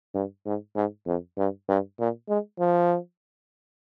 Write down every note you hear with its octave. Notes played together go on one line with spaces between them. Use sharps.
G2
G#2
G#2
F2
G2
G2
A#2
G#3
F3